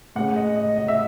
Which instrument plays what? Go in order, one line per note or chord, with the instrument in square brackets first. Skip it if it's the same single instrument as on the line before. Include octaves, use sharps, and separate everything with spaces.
[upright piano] A2 G#3 C#4 F#5
D#5
D#5
D#5
E5